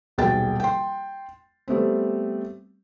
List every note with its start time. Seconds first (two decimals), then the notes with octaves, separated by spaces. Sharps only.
0.18 D#1 B1 G#4 G5 A6
0.60 G5 C6
1.68 G3 A3 B3 C4